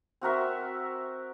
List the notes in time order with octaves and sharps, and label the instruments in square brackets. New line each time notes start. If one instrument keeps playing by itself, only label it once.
[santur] C4 F#4 A#4 E5